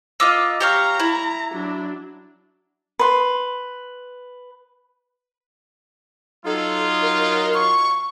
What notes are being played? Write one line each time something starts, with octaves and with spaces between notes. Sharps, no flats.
A#3 F4 D#5 D6 E6
G4 C#5 F5 A#5
E4
F#3 D4
B4 C6
F#3 D#4 F4 A4
A#4
C#6